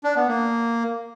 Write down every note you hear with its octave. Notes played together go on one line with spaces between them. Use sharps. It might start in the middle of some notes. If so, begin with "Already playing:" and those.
D4
B3
A#3